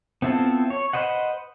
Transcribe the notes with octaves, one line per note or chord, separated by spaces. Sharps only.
B3 C4 E4 F4 A4
C#5
B4 C5 D#5 F#5